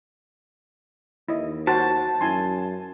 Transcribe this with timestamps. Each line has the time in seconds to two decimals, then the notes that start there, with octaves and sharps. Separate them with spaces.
1.28 D#2 E4 D#5
1.67 F#4 C5 A5
2.21 F#2 E4 G#5 C6